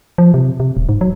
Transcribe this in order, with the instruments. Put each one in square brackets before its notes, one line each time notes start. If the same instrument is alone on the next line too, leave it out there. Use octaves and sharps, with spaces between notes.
[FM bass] F3
C3
C3
D#1
G#2
F#3